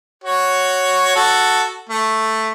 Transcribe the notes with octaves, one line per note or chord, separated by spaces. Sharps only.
F#4 C#5
F#4 A4
A3